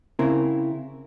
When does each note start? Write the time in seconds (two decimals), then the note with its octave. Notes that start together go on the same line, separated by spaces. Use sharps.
0.19 C#3 C4 E4 A#4